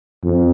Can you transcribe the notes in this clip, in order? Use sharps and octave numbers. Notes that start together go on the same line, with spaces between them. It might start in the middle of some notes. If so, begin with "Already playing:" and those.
F2